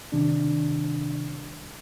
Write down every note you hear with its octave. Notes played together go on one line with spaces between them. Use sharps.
C3 D#3 G3 D4